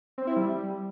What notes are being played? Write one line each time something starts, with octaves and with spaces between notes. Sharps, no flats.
C4
E4
G3